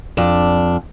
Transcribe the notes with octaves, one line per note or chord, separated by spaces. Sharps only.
F2 D4